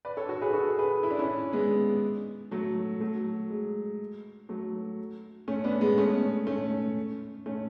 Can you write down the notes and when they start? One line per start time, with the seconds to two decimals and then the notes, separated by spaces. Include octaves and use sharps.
0.05 B4 D5
0.17 A4 C#5
0.29 F#4 A4
0.41 G#4 B4
0.53 F#4 A4
0.79 G#4 B4
1.03 E4
1.11 D4
1.19 C#4 E4
1.53 G#3 B3
2.51 F#3 A3
3.00 F#3 A3
3.50 G#3
4.49 F#3 A3
5.48 A3 C#4
5.64 B3 D4
5.81 G#3 B3
5.98 A3 C#4
6.47 A3 C#4
7.46 A3 C#4